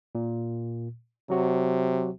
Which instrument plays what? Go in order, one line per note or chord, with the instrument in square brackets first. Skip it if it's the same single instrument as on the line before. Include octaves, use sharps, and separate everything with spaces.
[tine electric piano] A#2
[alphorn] C3 [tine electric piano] F#3 F#4